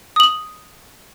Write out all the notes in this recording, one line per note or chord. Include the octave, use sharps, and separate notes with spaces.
D#6 F#7